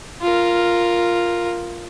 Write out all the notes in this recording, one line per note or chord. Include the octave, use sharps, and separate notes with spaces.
F4 A#4